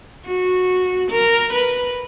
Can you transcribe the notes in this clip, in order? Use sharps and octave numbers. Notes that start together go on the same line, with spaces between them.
F#4
A#4
B4